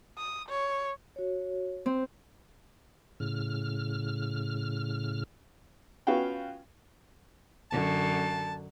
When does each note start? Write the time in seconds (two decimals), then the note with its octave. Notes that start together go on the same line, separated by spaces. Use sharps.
0.17 D#6
0.49 C#5
1.16 F#4 C#5
1.86 C4
3.20 A2 C#3 F6
6.07 B3 C#4 F4 F#4 F5 G5
7.71 F#2 D3 A5